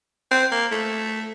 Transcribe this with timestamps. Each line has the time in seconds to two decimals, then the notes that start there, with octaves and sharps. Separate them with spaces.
0.31 C4
0.52 A#3
0.72 A3